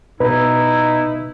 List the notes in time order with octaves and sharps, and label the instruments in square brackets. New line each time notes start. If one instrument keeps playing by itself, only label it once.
[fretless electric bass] B2 [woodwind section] D#4 E4 [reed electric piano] B4